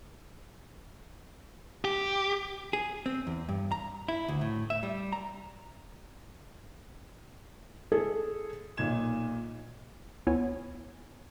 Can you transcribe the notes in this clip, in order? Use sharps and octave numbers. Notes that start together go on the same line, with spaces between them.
G4
G#4
C4
E2
G2
A#5
E4
D2
A2
E5
G3
A#5
G#4 A4
B1 A#2 D#4 G#6 E7
D2 B3 E4 F4 C#5 G#5